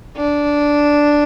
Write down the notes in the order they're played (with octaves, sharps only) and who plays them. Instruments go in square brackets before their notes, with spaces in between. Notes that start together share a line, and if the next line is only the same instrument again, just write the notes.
[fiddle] D4